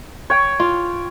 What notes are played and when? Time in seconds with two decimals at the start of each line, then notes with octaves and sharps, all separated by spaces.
0.30 C#5 G5
0.60 F4